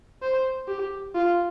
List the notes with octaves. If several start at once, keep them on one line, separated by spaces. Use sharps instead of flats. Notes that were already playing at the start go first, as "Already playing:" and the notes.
C5
G4
F4